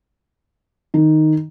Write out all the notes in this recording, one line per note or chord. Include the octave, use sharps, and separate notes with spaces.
D#3